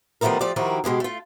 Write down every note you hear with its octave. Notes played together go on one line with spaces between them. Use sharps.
D#3 F3 G3 A3 B3 A#4
F3 A3 G4 D5
D#3 F3 E4 F#4 G4 A#4
B2 G#3 G4 G#4
A3 F4